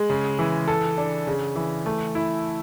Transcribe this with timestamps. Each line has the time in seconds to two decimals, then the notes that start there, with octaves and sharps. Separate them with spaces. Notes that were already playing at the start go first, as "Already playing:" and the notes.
Already playing: G#3
0.10 C#3
0.39 E3
0.68 A4
0.98 D4
1.27 C#3
1.56 E3
1.86 A3
2.15 E4